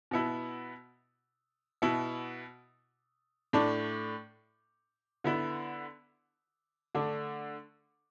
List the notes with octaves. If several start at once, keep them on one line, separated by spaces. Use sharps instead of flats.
B2 B3 E4
B2 B3 E4
A2 A3 D4
D3 B3 E4
D3 A3 D4